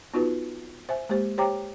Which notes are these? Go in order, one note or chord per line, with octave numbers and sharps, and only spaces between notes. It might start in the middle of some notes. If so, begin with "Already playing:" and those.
B3 D#4 F4 F#4 B4
C5 E5 G#5
G#3 A#3 G4 C5
G4 C5 C#5 G5 A#5 D6